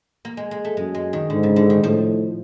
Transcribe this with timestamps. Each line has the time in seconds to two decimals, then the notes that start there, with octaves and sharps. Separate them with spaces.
0.25 A#3
0.37 G#3
0.51 G#3
0.64 A3
0.77 F#2 G#3
0.95 G#3
1.13 D#3
1.30 G#2 D3
1.43 C#3
1.56 D3
1.70 D#3
1.83 A2 F3